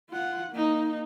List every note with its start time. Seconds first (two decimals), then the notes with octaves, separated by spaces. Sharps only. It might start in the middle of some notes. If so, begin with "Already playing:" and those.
0.10 F4 F#5
0.51 A#3 D#4